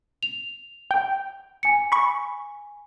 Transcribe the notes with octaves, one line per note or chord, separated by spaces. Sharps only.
F7
G5
G#5 C#7
B5 C#6